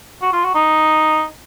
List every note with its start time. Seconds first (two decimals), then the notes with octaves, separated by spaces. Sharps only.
0.22 F#4
0.33 F4
0.44 F#4
0.55 D#4